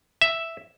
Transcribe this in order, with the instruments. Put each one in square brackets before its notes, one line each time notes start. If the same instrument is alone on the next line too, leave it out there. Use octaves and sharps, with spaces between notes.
[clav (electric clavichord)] E5